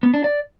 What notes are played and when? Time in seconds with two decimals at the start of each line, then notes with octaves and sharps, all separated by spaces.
0.03 B3
0.14 D4
0.24 D5